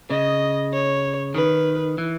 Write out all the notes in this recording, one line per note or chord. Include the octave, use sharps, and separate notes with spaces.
C#3 D#5
C#5
D#3 B4
E3